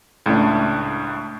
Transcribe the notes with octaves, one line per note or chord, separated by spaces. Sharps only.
C#2 A2 A3 D4